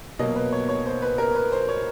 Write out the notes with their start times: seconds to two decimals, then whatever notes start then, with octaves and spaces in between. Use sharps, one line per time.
0.19 B2 F#3 A#3 D#5
0.36 B4
0.52 C#5
0.69 C#5
0.86 C5
1.02 B4
1.18 A#4
1.35 B4
1.52 C5
1.69 C#5